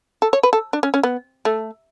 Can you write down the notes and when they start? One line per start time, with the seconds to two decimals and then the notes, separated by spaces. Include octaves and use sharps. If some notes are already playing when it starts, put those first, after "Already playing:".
0.22 A4
0.33 C#5
0.43 B4
0.53 A4
0.73 D4
0.83 C#4
0.94 C#4
1.03 B3
1.45 A3